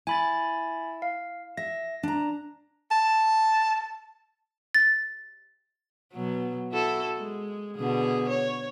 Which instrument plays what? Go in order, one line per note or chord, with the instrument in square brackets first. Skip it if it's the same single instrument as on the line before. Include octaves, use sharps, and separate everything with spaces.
[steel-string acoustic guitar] E4 [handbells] G#5 B5 A6
[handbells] F5
[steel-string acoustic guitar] E5 [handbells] A#6
[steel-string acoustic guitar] D4 A#5
[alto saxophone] A5
[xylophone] A6
[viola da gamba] B2 F#3
E4 F#4 A4
G#3
B2 D3 G#4
C#5